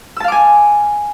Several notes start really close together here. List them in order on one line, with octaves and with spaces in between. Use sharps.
E6 A5 F5 D6 G#5